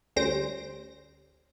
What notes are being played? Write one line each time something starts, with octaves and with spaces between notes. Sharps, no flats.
D2 G3 C#4 C5 A#6 D7